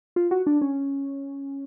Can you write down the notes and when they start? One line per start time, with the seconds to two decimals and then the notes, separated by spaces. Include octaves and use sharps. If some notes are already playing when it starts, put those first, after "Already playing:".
0.16 F4
0.31 F#4
0.47 D4
0.61 C#4